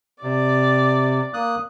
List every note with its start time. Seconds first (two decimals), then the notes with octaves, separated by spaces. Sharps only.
0.23 C3 D5
1.34 A#3 D#6 F#6